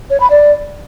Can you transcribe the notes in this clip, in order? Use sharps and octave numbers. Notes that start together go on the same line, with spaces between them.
C#5
B5
D5